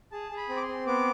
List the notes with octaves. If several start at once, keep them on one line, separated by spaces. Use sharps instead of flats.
G#4 A5
G#4
B5
C4
D6
C6
C4
B3 D6